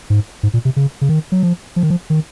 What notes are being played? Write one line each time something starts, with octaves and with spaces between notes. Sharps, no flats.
G#2
G#2
A#2
C3
C#3
C#3
D#3
F#3
F3
F3
D#3
F3
D#3